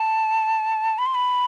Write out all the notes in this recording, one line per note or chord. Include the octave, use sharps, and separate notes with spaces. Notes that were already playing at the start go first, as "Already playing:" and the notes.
Already playing: A5
B5
C6
B5